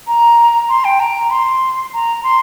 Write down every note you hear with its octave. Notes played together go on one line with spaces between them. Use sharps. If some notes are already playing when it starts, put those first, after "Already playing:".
A#5
C6
G5
A#5
C6
A#5
C6